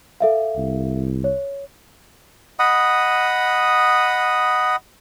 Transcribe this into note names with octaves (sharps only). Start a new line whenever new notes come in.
A4 E5 F5
C2
C#5
D#5 F#5 B5 D#6